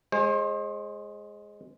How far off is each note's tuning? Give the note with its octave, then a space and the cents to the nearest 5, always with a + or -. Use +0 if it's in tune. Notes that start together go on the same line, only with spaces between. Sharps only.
G#3 +0 C5 +40